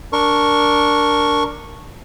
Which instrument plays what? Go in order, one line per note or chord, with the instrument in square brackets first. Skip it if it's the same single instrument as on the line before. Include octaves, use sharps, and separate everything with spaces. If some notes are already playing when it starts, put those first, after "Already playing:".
[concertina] D4 A#4 C#6